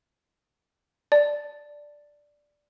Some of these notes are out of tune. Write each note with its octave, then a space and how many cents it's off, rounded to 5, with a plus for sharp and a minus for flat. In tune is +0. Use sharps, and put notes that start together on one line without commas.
D5 +0 A5 +5